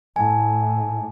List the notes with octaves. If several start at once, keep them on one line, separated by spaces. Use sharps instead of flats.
A2 G#5 A5